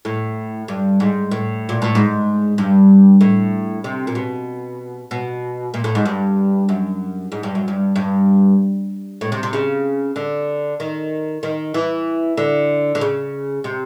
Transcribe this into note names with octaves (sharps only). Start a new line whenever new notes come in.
A2
G2
G#2
A2
A#2
A2
G#2
G2
A2
C3
A#2
B2
B2
A#2
A2
G#2
G2
F#2
G#2
G2
F#2
G2
G2
A2
C3
C3
C#3
D3
D#3
D#3
E3
D3
D3
C#3
C3